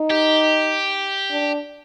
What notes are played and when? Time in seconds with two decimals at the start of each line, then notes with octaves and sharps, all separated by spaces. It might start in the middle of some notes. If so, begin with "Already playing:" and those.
Already playing: D#4
0.10 G4
1.31 D4